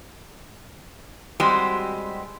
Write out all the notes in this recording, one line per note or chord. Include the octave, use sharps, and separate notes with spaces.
G3 G#3 C4 F#4 G4 D#5